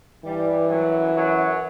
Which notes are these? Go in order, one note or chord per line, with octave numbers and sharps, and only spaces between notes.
G2 E3 G3
F#2 F#3
F#2 F#3